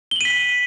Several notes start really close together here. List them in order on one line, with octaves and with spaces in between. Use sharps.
G7 F#7 D#7 B6